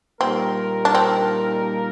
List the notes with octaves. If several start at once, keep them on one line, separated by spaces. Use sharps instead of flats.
A#2 G3 A#3 C4 D#4 A#4
D4
C4